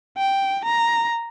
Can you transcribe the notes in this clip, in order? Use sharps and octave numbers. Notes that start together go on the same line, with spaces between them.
G5
A#5